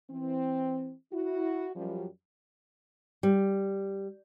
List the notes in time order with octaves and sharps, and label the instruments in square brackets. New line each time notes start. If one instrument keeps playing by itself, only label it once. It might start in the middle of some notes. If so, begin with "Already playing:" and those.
[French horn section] E3 C4
E4 F#4
F#2 F3 G3
[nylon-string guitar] G3